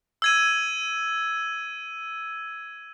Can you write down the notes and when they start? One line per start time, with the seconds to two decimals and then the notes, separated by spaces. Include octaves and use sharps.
0.22 E6 G#6 D#7